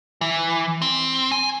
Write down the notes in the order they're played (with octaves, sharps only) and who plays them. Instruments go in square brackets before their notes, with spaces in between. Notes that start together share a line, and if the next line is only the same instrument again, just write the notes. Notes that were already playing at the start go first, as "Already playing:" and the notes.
[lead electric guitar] E3
C4
G#5